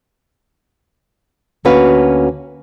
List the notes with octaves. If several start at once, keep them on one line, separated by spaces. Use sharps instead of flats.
D2 A#3 C#4 F#4 B4 F5